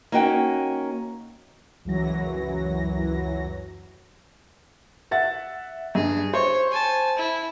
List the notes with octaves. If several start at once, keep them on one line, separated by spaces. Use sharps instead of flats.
A#3 C#4 D#4 F#4 A#4 G5
C#2 F#2 E3 F#3 A#6
E5 F#5 A6
G2 G#4
C5 C#5
G#5 A5
E4